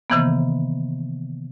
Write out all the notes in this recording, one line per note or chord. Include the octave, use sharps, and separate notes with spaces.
C3 D#3 E3 A#3 B3